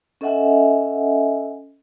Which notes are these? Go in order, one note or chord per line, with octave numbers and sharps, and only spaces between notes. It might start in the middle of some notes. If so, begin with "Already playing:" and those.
C#4 A4 D#5 E5 F#5 G#5